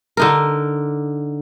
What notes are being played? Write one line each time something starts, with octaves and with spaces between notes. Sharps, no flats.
D3 D#4 A#4